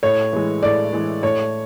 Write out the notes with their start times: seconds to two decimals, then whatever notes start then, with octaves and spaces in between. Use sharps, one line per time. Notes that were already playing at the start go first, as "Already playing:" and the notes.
0.03 A2 C#5
0.33 E3 G#3
0.63 A2 D5
0.93 E3 G#3
1.23 A2 C#5